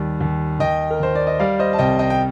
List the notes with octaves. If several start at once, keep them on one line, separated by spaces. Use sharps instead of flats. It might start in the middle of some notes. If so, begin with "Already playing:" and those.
Already playing: D#2 G3
D#2
D#2 D#5 G5
A#4
D#2 C5
D5
D#5
G3 D5 F5
C5 D#5
A5
C2 D#5 G5
D#5 G5
G5